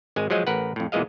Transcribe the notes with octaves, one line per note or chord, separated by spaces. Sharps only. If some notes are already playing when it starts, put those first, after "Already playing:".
G#1 G#3 G#5
F3 F#3 G#3 G#4 D#5
A1 A#4 B4 F#5
F2 A2
E2 A#2 E3 G#3 D#5 F5